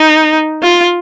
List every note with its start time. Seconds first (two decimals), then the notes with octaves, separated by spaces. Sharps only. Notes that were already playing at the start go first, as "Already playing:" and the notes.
Already playing: D#4
0.63 F4